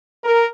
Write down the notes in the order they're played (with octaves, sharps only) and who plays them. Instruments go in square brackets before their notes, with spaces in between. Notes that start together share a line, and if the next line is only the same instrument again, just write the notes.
[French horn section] A#4